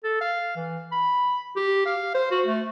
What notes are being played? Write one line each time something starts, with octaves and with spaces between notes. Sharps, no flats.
A4
F5
E3
B5
G4
F5
C5
F#4
A3